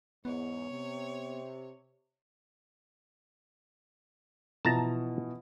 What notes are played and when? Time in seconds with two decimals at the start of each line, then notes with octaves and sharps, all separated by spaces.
0.25 E2 G#2 B3 C#5
0.71 C3
4.65 B2 E3 F3 A5 A#5